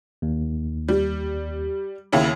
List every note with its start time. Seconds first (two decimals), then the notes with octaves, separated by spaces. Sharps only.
0.22 D#2
0.88 G3
2.12 D#2 C#3 E4